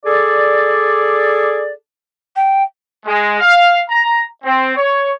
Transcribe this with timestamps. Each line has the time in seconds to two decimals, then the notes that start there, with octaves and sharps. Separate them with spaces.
0.05 G#4 A4 D5
2.36 G5
3.05 G#3
3.40 F5
3.89 A#5
4.44 C4
4.77 C#5